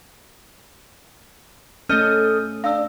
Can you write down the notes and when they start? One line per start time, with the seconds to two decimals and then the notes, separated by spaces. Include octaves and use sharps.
1.89 A3 C#4 A4 D#5 F6 G6 D#7
2.64 D4 F5 E6